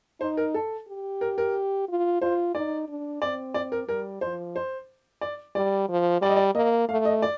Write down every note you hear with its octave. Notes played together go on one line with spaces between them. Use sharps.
D#4 C5
A#4
A4
G4
A#4
A#4
F4
F4 C5
D#4 D5
D4
C4 D5
D5
A#4
G3 A#4
F3 C5
C5
D5
G3 D5
F3
G3 D5
D#5
D5
A#3 D#5
A3 F5
D#5
D5